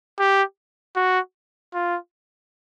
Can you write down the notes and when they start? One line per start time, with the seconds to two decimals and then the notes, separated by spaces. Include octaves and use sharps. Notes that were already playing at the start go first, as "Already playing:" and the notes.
0.19 G4
0.96 F#4
1.74 F4